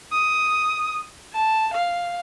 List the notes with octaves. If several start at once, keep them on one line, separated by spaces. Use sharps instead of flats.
D#6
A5
F5